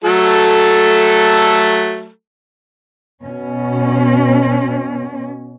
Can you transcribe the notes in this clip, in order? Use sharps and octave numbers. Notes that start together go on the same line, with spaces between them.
F#3 A3 A4
B2 C#4